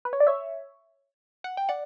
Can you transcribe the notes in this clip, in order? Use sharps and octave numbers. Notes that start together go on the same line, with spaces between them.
B4
C#5
D5
C#5 E5
F#5
G5
D5 F#5